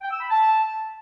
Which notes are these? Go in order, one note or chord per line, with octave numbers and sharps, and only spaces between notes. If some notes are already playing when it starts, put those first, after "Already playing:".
G5
E6
B5
A5